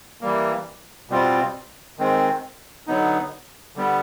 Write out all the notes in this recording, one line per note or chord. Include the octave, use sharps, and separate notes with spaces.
E3 G3 A#3
B2 G3 C4 F4
D#3 G#3 C4
D3 F#3 B3 D#4
D3 G3 B3